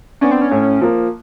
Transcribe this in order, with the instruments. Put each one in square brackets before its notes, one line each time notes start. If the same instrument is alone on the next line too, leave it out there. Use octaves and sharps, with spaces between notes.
[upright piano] B3 D4 [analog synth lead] C#4
[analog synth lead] C4
C#4
[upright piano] A2
F3 A#3